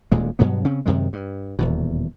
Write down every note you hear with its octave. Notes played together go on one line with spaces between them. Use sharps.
D#1 D2 A#2 G#3
G2 B2 F#3 B3
C#3 C4 C#4
F#2 C3 D#3 G#3
G2
D#1 E2 B2